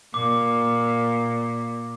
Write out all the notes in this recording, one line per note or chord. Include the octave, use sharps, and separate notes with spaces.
A#2 D6